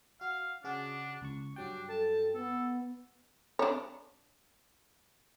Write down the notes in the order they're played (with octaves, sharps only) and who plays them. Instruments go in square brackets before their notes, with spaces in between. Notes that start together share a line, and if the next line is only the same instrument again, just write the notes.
[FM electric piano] F#4 [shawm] F5
[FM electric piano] C#3 F#4 G#4 [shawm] D4
[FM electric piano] C#2 C#6
[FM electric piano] G2 F#3 G5 [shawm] D4
[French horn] A4 [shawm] A5
[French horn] B3 [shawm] A4
[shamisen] D4 C#5